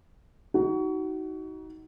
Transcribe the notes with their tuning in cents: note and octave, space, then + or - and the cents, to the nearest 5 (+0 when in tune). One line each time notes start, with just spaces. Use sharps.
D#4 +25 F#4 +25